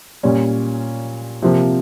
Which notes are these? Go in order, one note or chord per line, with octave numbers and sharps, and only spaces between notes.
A#2 G3 C#4
C3 F3 A#3